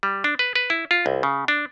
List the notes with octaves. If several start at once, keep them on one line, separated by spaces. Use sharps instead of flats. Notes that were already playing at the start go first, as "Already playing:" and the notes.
G3
D4
B4
B4
E4
F4
C2
C#3
D4